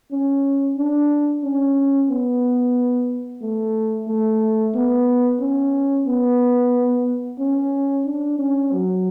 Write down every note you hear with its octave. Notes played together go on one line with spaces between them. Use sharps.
C#4
D4
C#4
B3
A3
A3
B3
C#4
B3
C#4
D4
C#4
F#3